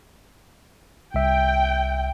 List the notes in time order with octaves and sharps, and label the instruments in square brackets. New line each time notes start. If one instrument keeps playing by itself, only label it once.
[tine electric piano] C2 E5 [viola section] G5